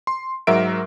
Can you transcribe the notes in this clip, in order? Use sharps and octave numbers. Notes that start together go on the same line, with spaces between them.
C6
G#2 F#3 A#4 E5 D7